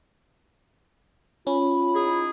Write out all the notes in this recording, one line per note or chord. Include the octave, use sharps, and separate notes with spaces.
C#4 F4 B5
D#4 E4 G#4